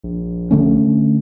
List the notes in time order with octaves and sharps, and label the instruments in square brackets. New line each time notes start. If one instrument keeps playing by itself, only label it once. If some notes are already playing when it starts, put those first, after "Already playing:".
[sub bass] A#1
[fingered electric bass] D3 A3 C#4